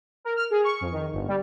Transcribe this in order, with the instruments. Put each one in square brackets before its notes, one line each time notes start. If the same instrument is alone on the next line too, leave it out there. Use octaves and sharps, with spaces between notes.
[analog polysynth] A#4
F6
G#4
C#6
F2
D#3
G1
G3